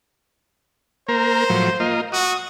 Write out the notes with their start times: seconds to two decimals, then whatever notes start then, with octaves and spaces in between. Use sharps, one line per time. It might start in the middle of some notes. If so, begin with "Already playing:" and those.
1.09 A#3 A#4 C5
1.50 A2 F3 F#3
1.80 A#3 F4 D#5
2.13 F#4 D#6